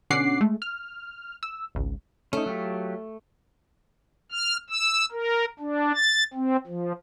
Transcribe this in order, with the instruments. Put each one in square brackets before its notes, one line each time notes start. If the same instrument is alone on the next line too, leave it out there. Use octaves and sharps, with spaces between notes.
[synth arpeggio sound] B2 D3 C#4 F#5 D6 C7
G#3 A3
F6
E6
G#1 C#2
[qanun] A3 [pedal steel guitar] C#4 D#4
[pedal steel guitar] F#3 F4 G4
[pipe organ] F6
E6
A#4
D4
A6
C4
F3